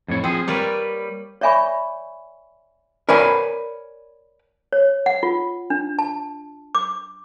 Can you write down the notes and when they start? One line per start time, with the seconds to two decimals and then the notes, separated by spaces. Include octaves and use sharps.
0.08 F2 A2 C#5
0.24 F3 C4 G#4
0.48 G3 A#3 B4 C#5 D5
1.41 C#5 D5 E5 G#5 B5 C#6
3.09 A#4 B4 C#5 D5 G#5 B5
4.73 C#5
5.06 F#5
5.23 F4
5.70 D4
5.99 A5
6.75 D6